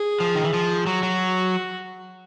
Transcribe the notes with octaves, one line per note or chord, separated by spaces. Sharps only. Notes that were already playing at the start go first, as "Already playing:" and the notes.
Already playing: G#4
F3
D#3
E3
F3
F#3 F#4
F#3